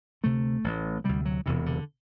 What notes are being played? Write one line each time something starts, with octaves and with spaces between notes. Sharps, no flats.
D2 C3 A3
A1 A2
D2 C3 G3
F#3
E1 E2 C3 E3
D3